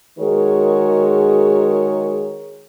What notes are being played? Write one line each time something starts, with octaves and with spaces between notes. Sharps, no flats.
D#3 G#3 F#4 G#4 A#4 C#5